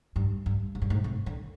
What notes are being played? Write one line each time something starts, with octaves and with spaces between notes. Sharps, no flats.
G2
G2
G#2
G2
G#2
C3
D3